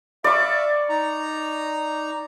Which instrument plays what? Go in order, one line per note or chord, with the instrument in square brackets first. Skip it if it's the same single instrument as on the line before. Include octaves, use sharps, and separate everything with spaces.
[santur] D5 C#6 [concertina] E5 F5
[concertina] D#4 A#5